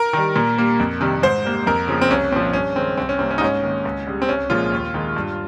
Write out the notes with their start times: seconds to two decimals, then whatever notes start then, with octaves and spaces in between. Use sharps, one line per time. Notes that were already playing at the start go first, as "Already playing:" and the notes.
Already playing: A#4
0.13 D#3 G3
0.36 A#2
0.57 G3 A#3
0.79 F2
1.01 C3 D#3 G3
1.23 G#2 C5
1.44 G3 A#3
1.66 F2 A#4
1.88 C#3 F3 A#3
2.01 C4
2.10 C2 C#4
2.32 A#2 F3 C4
2.53 G2 C#4
2.76 D#3 G#3 C4
2.97 C2 C4
3.09 C#4
3.19 C3 G3 A#3 C4
3.31 C#4
3.38 D#4
3.41 G#2 C#4
3.63 D#3 A#3
3.85 C#2
4.07 C#3 G3
4.22 C4
4.29 C2 C#4
4.50 A#2 F3 G#3 F4
4.72 D#2
4.94 D#3 G#3
5.16 G2